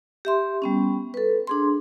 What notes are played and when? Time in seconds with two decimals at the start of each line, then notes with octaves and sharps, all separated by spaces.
0.25 G4 E5 C6
0.62 G3 B3 C#4
1.14 A4 B4
1.47 D4 G#4 C6